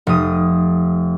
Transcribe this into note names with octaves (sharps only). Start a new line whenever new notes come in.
F1 D#6